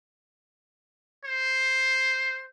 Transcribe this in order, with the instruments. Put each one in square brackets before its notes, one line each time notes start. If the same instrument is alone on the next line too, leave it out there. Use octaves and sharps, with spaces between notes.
[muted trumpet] C5